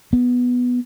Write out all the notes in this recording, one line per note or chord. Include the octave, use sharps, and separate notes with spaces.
B3